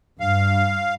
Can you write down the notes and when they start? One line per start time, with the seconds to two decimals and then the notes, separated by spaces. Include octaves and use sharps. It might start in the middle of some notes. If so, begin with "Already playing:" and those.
0.20 G2 F5